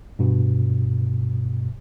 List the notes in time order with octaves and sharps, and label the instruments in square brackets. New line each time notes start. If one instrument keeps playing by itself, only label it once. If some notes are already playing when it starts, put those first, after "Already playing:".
[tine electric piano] G2 B2